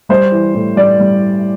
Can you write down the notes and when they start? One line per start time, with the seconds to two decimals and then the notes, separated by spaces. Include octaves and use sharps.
0.09 G3 C5
0.32 E3
0.54 A2
0.76 G3 D5
0.99 G3